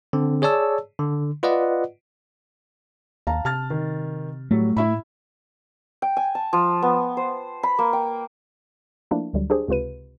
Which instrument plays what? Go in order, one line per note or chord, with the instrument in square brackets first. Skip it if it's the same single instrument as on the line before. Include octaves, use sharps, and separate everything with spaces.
[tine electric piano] D3 C4
G#4 C#5 D5 A5 E6
D3
F4 B4 D5 D#5 F#5
[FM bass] D#2 [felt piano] F5 A5 A#5
[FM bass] C3 [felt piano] A5 F6 A6
[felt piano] D#3
[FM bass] A2 [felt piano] F#3 G3 [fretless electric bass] A3
[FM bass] A2 [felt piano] E4 E5 B5
[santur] G5
G#5
A5
F3
B3
C5
B5
A#3
G5
[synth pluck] F3 A3 A#3 D4 E4
D2 D3 F#3 G3
D4 G4 G#4 C5
C#2 C3 F4 B4 D#7